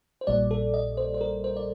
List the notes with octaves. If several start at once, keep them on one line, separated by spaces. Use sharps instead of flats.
C5
A#1 A#2 G3 D5
A4
D#5
C5
C5
A#4
C5
D5